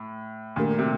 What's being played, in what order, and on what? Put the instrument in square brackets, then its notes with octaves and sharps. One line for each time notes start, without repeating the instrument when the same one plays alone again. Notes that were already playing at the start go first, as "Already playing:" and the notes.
Already playing: [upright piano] A2
[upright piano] A#2 [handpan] D#3 A3 D4 G4 A#4
[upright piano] C3